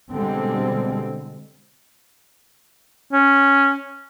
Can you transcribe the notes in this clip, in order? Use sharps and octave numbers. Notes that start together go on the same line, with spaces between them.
B2 D3 G3 G#3 C4
C#4